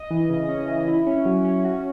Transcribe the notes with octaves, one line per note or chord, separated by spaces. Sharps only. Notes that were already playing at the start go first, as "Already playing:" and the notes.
Already playing: D#5
E3
C#3
C#4
E3
E4
C#4
F#3
C#4
F#4